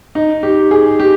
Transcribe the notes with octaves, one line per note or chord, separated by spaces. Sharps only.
D#4
G4
G#4
G4